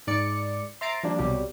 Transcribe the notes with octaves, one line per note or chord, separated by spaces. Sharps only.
G#2 D5 C#7
C5 E5 A#5 A6 C7 D7
F3 G3 A#3 D4
C2 B2 F#3 G3 G4